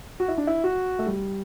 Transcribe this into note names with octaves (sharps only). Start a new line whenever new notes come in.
F#4
E4
D4
E4
F#4
A3
G3